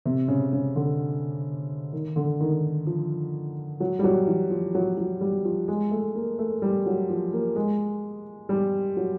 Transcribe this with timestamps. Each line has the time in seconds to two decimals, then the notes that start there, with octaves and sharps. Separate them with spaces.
0.05 C3
0.28 C#3
0.53 C#3
0.76 D3
1.93 D#3
2.16 D3
2.41 D#3
2.87 F3
3.80 F#3
3.99 G3
4.04 F#3
4.27 E3
4.50 F3
4.75 F#3
4.98 F#3
5.21 G3
5.45 F3
5.68 G#3
5.91 A3
6.15 A#3
6.39 A3
6.62 G3
6.86 F#3
7.09 F3
7.33 A#3
7.56 G#3
8.49 G3
8.97 F#3